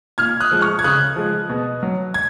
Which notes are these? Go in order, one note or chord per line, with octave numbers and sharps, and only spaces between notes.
A#2 F6 G#6
D#6 F#6
F3 G#3
C#6 F6
G#6
C#3 D#6 F#6
F3 G#3
B2
F#3
G#6